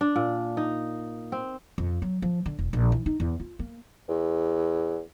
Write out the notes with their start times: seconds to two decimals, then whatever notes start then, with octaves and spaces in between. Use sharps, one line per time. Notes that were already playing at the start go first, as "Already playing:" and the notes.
0.01 D4
0.16 A#2
0.57 D#4
1.32 C4
1.78 F2
2.02 F#3
2.22 F3
2.46 D3
2.59 E1
2.73 A#1
2.92 E3
3.06 D#4
3.20 E2
3.40 F4
3.59 A#3
4.08 E2